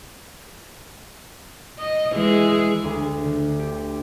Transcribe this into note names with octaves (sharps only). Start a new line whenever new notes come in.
D#5
E3 G#3 G#4
D2
D3
G4